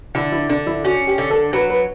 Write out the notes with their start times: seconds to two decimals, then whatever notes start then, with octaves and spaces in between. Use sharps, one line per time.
0.15 D3 E4
0.32 E4
0.49 D3 D4
0.67 E4
0.84 C#4 F#4
1.07 G4
1.18 D3
1.30 A4
1.53 F#3 B4
1.70 B4